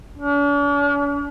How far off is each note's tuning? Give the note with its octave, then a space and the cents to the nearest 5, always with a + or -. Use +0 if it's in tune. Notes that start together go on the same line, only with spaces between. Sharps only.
D4 -45